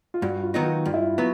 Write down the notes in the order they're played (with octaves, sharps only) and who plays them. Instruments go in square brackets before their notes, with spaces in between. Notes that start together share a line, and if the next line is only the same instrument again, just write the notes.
[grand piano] F4
[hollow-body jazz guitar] G2 [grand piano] F#4
[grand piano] F4
[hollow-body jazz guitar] D#3 F#3 B3 D#4
[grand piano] F4
[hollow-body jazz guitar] G2 [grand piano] F4
[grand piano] E4
F4
[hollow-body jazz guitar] F#3 B3